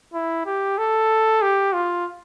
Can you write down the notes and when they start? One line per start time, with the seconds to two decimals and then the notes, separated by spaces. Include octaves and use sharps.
0.14 E4
0.46 G4
0.78 A4
1.42 G4
1.73 F4